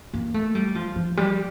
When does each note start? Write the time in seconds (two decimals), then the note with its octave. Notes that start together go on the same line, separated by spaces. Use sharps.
0.14 A#3
0.34 A3
0.55 G3
0.75 F3
0.96 F3
1.17 G3